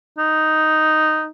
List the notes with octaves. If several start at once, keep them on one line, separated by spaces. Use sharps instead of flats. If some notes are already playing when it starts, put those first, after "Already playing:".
D#4